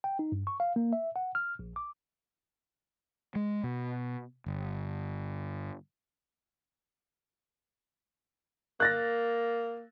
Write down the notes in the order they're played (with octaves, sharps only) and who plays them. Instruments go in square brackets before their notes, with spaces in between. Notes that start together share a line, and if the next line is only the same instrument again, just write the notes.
[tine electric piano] G5
D#4
G2
C#6
F5
A#3
E5
F#5
F6
A#1
D6
[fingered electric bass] G#3
B2
G1
[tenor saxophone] A#3 [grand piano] F#6 A6 A#6